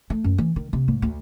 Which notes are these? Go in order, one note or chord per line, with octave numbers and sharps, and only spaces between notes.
A3
F#2
E3
D#3
C3
G#2
D2